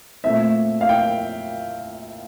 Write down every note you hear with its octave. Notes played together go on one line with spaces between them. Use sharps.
A#2 A3 C4 E5
F5
G5